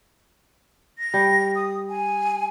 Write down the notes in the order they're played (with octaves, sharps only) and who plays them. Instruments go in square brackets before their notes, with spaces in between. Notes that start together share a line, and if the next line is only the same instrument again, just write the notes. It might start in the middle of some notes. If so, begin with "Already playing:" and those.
[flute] A#6
[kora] G3
[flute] D#6
G#5